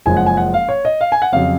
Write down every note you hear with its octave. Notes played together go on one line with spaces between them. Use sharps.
F#1 F#2 F3 G#3 G#5
F#5
G#5
F#5
F5
C#5
D#5
F5
G#5
F#5
F2 C#3 F#3 F5